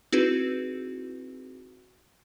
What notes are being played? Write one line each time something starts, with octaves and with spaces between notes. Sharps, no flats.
C4 D#4 E4 F#4 G#4 B4